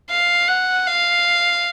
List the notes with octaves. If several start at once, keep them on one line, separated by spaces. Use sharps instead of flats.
F5
F#5
F5